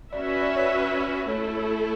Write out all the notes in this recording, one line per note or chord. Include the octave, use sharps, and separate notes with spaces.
C#4 F#4 B4 D5 E5
D5
C#5
A3 E4 A4 C#5
C#5